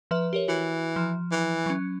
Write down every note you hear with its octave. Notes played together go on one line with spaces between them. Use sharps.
F3 B4 E5
G4 A#4 C#5
E3 F#4
F3
E3
F#3 C#4